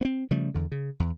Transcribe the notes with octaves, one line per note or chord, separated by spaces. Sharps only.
B3 C4
C#3 F3 G3 A3
E2 D3
C#3
E2